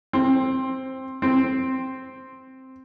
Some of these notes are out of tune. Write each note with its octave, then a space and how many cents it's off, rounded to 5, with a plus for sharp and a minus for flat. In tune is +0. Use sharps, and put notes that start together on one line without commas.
C4 +10
C4 +0